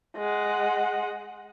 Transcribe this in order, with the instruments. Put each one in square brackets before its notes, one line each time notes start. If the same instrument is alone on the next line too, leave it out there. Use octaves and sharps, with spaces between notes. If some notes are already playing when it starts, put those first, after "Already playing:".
[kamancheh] G#3 F#5